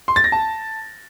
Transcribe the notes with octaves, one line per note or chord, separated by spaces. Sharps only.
C6
A6
A#6
A5